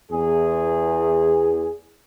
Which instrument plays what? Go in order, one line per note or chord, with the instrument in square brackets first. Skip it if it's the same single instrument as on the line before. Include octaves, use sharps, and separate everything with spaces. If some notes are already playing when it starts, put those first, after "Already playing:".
[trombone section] E2 G#4